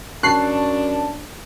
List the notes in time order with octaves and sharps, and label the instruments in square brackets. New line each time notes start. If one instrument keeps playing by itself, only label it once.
[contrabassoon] F#2 [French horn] D4 [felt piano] A5 C#6 [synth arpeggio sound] F#6 C7